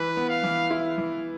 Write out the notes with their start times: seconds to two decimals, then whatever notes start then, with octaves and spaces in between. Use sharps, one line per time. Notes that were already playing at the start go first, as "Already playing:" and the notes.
Already playing: E3 B4
0.17 B3
0.29 F5
0.44 E3
0.71 E4
0.98 E3